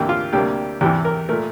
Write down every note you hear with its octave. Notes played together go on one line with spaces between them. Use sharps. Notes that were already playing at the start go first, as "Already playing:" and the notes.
Already playing: D2 C3 E3 A#3 G4
F4
D2 C3 G3 A#3 G4
E2 C3 E3 G4
A#4
A#2 A3 A#4